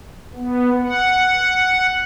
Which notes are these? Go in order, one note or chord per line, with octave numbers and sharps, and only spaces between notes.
B3
F#5